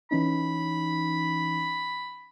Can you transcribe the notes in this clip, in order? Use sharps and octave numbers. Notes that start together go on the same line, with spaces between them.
E3 C#4 D#4 B5